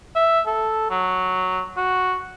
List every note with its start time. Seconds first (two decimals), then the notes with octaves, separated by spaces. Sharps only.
0.15 E5
0.47 A4
0.91 F#3
1.77 F#4